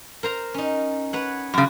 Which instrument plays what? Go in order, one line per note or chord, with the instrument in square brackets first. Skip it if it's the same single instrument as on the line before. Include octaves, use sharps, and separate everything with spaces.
[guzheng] A#4 C5 A#5
C#4 D#4
B4 C#5 F#5
[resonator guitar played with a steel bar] F#2 C#3 [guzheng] F#4